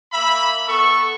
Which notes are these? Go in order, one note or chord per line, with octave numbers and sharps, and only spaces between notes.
A#3 E5 B5
B3 A4 C#6